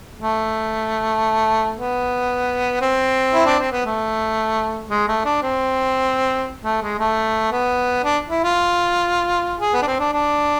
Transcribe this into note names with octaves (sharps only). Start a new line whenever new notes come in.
A3
B3
C4
E4
D4
C4
B3
A3
G#3
A3
D4
C4
A3
G#3
A3
B3
D4
E4
F4
G#4
B3
D4
C4
D4
D4